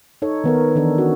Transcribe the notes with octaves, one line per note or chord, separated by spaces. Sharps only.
D#4 A4 C#5
D#3 B3 A#4
D#3 E3 D4 A4
C#4 F#4